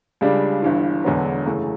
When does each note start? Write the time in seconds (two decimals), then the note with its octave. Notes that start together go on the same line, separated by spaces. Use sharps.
0.21 C#2 C#3 G3 D4
0.62 G1 G2 E3
1.04 E1 E2 D3 F#3 B3
1.46 F#2 C#3 E3 A3